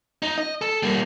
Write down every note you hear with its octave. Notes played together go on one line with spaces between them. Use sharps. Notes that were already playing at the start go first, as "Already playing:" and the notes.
D#4
D#5
A4
G3 A#3